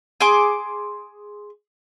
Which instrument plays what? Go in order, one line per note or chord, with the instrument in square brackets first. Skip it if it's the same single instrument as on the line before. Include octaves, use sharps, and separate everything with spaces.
[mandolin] G#4 C6 D6